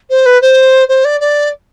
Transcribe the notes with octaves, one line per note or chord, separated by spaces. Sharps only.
C5
B4
C5
C5
D5
D5